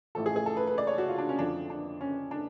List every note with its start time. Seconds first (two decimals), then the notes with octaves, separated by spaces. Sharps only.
0.15 A1 A2 F3 A4
0.26 G#4
0.36 G#4
0.46 A4
0.57 B4
0.67 B4
0.78 D5
0.87 C#5
0.98 F#4
1.08 F4
1.18 D4
1.29 C#4
1.39 F2 D3 F3 D4
1.70 D4
2.01 C#4
2.31 D4